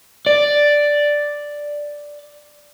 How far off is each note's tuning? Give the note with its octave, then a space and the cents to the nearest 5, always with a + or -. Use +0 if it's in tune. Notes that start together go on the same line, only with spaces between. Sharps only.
D5 +0